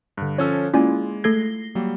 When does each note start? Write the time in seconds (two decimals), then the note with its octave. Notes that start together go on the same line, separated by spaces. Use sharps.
0.17 G2 D3 F#6
0.38 F3 C#4 A4 C#5 E6
0.74 G#3 A#3 C#4 E4 F4 D5 G#5
1.24 A3 A4 G#6 A#6 C7 G7
1.75 F#3 G3 A#3